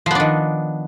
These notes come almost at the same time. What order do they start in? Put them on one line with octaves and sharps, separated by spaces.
F3 B3 D4 D#3